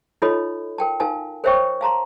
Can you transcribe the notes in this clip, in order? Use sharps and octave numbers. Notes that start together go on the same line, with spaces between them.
D#4 F4 A4 C#5 D#5 B5
A#4 G5 A5
D#4 A#4 F5 G#5 A5
A#4 C5 C#5 E5 G5 C#6
F5 A5 A#5 C6